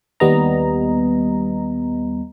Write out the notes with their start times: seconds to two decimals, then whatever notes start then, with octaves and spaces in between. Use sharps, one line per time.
0.20 D#2 G3 B3 D#5 A#5